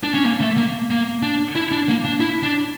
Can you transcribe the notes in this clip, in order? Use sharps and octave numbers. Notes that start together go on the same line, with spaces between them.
D4
C#4
A#3
A3
A#3
A#3
D4
E4
D4
A#3
D4
E4
D4